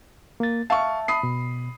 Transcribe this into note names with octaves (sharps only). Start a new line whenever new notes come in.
A#3 A6
E5 F5 A5 C#6
B5 D#6 C7
B2